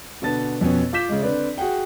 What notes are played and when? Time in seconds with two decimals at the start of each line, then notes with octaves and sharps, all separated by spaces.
0.22 B2 D3 B3 A5 A6
0.61 F2 B2 B3 C#4
0.93 F4 D6 G6 B6 E7
1.09 C#3 G#3
1.22 D3 C4 B4 D5
1.58 F#4 G#4 F#5 G5